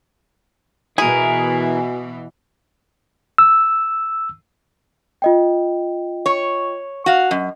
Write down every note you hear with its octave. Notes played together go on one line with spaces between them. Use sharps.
B2 E3 E4 F#4 G#4 A#4 G#5
E6
F4 D#5 G5
C#5
F#4 F5
F#2 D#5